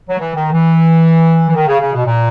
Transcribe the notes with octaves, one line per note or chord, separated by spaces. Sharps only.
F#3
E3
D#3
E3
E3
D#3
C#3
C#3
B2
A#2